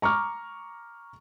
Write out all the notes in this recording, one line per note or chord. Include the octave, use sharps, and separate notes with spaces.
A#5 C#6 D6 F6